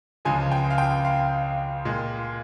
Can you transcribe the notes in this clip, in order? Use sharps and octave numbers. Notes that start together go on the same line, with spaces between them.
C#2 C#3 F3 G#3 G#5
G5
F5
G5
F5
A#2 G#3